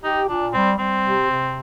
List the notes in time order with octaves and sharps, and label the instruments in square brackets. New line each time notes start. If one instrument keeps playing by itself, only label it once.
[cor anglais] D#4 [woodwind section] G4
[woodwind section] A#2 [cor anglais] D4
[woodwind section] G3 [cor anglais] C4
[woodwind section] G3 [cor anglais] C4
[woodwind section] C3
C3